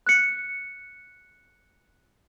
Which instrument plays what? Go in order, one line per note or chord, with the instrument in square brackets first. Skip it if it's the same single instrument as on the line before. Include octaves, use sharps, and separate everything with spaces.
[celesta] F#6 C#7